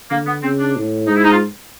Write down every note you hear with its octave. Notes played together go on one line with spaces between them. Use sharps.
D3 A#3
B3
C#3 C4
D4
A2
G#2 D#4
E4
D#4
F4